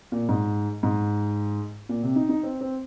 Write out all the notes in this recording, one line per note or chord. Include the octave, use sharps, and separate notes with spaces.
A#2
G#2
G#2
A#2
C3
D#4
D#4
C4
C4